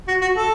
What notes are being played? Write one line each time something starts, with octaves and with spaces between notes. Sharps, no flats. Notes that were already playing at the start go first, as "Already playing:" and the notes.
F#4
F#4
A4